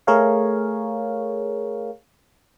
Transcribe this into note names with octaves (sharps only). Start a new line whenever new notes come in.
A3 G#4 A#4 C#5 F5